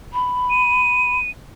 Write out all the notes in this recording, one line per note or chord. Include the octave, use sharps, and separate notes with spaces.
B5
D#7